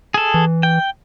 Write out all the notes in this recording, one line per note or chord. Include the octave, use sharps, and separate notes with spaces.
G#4 A4
E3
G5